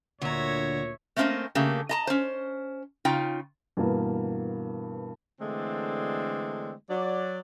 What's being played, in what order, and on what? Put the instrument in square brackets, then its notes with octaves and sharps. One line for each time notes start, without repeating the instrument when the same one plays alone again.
[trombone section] D2 A#2 [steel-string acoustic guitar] D3 A#5 [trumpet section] C#5 [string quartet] E5 G#6 A#6
[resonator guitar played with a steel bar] A3 A#3 C4 C#4 C5 D#5
C#3 A3 A#3 G4
D#5 A5 A#5
C#4 C5
C#3 D#4 F4 G5
[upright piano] G2 B2 E3 A#3
[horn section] D3 E3 G#3 A3 C4 D4
F#3 D5